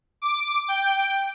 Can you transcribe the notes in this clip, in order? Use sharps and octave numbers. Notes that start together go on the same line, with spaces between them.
D6
G5